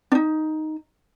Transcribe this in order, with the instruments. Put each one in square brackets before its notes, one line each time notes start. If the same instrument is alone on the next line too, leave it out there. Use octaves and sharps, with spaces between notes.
[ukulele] D4 D#4